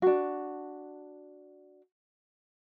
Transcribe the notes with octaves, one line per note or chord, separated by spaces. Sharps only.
D4 F#4